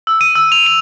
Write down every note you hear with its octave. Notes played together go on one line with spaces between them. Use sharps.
E6
D#7
E6
F7
D#7